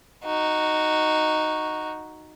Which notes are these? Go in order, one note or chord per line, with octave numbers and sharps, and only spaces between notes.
D#4 F#4